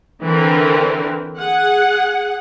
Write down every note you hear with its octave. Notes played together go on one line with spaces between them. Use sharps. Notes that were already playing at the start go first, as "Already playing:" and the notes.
D3 E3 C4 A#4
G#4 F#5